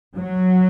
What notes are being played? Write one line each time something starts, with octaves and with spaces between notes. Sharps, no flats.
F#3